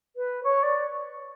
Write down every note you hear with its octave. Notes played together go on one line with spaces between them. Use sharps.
B4
C#5
D5